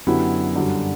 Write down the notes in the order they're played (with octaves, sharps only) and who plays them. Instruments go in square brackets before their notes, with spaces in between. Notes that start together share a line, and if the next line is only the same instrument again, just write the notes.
[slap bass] F#2 [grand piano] D3 F#3 B3 E4 G4
[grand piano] G2 D3 F#3